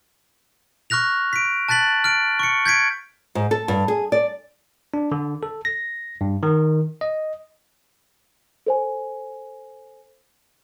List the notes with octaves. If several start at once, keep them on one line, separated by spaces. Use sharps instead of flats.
C#6 F6 F#6 A#6 F7
B6 D7
A5 F#6 A6 B6 F#7
F6 D7
C#6 C#7
G6 G#6 B6 D7
G#2
A4
G2
G#4
D5
D4
D3
A4
A#6
G2
D#3
D#5
A4 C5 G#5